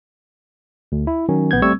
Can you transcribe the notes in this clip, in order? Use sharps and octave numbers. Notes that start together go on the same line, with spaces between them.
D2
E4
D#3 F#3 C#4
A#1 B3 G6 G#6
G3 A3 C4 C#6 E6 G#6